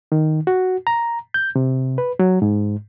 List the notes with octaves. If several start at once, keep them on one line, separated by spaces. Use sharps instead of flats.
D#3
F#4
A#5
G6
C3
B4
F#3
G#2